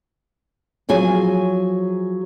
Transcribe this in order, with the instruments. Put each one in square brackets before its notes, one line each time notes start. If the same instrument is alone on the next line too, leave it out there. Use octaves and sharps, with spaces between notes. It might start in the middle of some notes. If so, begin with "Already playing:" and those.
[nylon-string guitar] F3 F#3 G#4 G#5